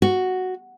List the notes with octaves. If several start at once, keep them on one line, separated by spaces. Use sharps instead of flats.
F#4